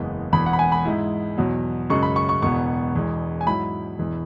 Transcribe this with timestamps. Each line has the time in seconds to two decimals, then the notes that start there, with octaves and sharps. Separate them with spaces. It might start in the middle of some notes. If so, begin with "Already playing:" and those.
Already playing: F#1 E2 E3 G#3 B3
0.33 E1 E2 E3 B5
0.46 F#5
0.53 B5
0.59 G#5
0.72 B5
0.85 G#2 G#3 E4
1.38 E2 B2 F#3
1.90 F#2 C#3 G#3 C#6
2.03 B5
2.16 C#6
2.29 C#6
2.42 E1 E2 B2 B3 C#6
2.94 E1 E2 E3 G#3
3.41 G#5
3.46 G#2 F#3 E4 B5
3.99 E1 E2 E3 G#3